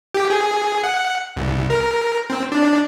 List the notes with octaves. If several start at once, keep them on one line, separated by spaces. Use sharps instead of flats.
G4
G#4
F#5
C2
A#4
C4
D4